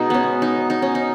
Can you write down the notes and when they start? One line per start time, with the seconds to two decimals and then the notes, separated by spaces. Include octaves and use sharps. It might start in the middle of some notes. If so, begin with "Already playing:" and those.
Already playing: B2 G#3 D#4
0.10 B3 C#4
0.42 D#4
0.70 D#4
0.82 C#4
0.95 D#4